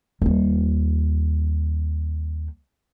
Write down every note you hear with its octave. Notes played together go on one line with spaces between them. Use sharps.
D#2 G3